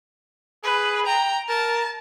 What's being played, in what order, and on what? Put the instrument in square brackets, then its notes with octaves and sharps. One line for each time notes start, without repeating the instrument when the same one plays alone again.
[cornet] G#4 [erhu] B4
[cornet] G5 [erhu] A#5
[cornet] A#4 [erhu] A5